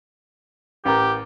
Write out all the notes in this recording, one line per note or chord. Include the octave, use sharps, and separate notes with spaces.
A1 G4 A#4